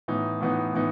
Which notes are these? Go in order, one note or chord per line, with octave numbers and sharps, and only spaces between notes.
A2 E3 B3 D#4
A2 E3 B3 D#4
A2 E3 B3 D#4